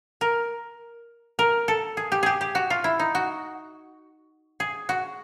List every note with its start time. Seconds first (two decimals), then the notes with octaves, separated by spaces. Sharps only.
0.21 A#4
1.39 A#4
1.68 A4
1.97 G#4
2.12 G4
2.23 G4 G#4
2.41 G4
2.55 F#4
2.70 F4
2.84 E4
2.99 D#4
3.15 F#4
4.60 G#4
4.89 F#4